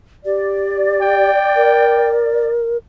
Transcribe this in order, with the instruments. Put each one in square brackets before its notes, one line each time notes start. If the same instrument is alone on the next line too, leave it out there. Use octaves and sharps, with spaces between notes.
[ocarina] G4 [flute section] D5
[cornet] G5
[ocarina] A#4